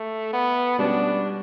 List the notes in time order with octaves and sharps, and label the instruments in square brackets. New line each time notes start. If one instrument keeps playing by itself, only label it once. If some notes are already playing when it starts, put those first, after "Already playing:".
Already playing: [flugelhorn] A3
B3
[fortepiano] B2 G3 C#4 F#4 B4 [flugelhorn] D4